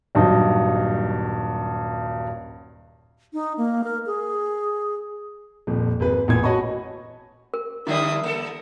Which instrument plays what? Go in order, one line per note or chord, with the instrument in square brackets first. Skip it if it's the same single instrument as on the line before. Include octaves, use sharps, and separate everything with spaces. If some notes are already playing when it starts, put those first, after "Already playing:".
[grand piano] D#1 G2 F#3 D#4
[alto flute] D#4
A#3
A#4
G#4
[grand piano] D#1 F2
G#1 G#4 B4
A1 A#2 B3 G#6
F#4 C#5 D#5 A5 B5 C#6
[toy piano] A#4
[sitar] G2 D3 G3 [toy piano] E4 D5 [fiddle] E5 D#6
[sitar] A#3 A4 [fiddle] A#4